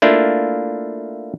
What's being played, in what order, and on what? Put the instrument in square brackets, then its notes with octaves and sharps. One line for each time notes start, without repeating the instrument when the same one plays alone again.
[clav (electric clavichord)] A3 A#3 D4 E4 F4